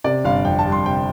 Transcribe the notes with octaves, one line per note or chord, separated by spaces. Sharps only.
C3 D5
G1 F5
F2 G5
A5
G3
C6
C3 G5